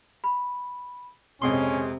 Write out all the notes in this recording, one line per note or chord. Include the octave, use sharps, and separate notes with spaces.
B5
F2 C3 G#3 C#4 C6 D#6 C7 G7